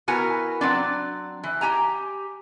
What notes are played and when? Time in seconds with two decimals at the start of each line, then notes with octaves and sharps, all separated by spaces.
0.08 B3 E4 F#4 A#4 G#5
0.61 F#3 C4 D4
1.43 E3
1.61 G4 G#5 A#5